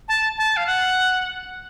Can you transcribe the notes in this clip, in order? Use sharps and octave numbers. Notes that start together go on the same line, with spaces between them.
A5
A5
F5
F#5